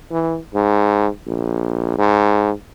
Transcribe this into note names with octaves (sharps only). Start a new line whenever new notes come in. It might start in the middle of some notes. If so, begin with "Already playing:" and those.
E3
G#2
A#1
G#2